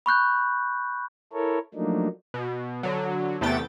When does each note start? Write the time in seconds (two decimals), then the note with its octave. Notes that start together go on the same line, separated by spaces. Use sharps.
0.06 B5 C#6 F#6 G6
1.33 E4 A4 A#4 C#5
1.74 F3 F#3 A3 A#3 D4 D#4
2.34 B2
2.83 D3 F#3
3.41 E2 C3 A3 B3 G5 A6